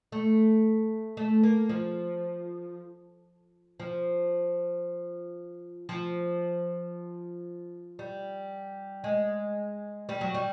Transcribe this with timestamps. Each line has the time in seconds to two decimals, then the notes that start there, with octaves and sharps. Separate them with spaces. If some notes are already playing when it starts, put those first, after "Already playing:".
0.12 A3
1.17 A3
1.43 A#3
1.69 F3
3.80 F3
5.89 F3
7.99 G3
9.04 G#3
10.09 G3
10.21 F#3
10.34 G3